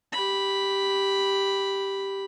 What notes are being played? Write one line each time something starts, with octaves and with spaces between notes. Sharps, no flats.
G4 B5